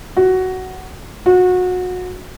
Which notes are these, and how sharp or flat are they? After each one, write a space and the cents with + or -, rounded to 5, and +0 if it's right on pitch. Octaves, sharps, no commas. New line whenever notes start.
F#4 +10
F#4 -25